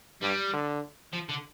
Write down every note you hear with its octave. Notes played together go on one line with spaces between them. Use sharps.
G2 G3
D3
F3
D3